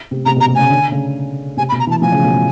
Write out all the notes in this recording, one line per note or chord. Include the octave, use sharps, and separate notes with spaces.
C3
C3 A#5
B2
A#5
C3
C#3 G#5
D3
C#3
C3 G#5
B5
B2
A#5
E3
A5
F3 G#5
C#3
B2
A2